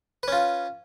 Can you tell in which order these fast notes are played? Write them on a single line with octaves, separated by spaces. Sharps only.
B4 C#4 F4